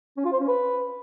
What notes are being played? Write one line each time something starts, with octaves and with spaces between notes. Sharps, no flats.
C#4
F4
C5
C#4
B4